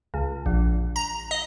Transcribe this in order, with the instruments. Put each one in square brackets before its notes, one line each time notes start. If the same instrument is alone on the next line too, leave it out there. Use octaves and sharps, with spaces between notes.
[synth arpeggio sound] C#2
A#1
A#5
D#5